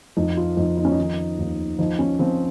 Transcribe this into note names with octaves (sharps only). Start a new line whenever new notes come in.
F2 D#4
F4
F2 D#4
D#4
C#4
D#4
D#3
D#2
F3 D#4
C#4
F3 C4